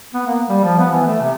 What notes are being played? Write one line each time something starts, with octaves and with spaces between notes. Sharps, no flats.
B3
A#3
G3
F3
B3
E3
A3
C3